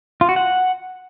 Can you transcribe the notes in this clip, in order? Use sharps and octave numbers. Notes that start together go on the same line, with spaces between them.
F4
F#4
F#5